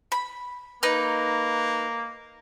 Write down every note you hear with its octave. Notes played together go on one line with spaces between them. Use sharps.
B5
A#3 D#4 B4